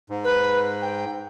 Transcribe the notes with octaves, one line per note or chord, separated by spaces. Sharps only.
G#2
B4
G5